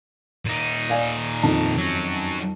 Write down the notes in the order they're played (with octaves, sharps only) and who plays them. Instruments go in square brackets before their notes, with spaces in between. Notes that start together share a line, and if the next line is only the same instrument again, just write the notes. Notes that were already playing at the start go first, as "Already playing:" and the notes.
[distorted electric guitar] A#2 D#4
[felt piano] D5 F5 G#5
F2 D#3 A5
[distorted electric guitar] F#3 C#4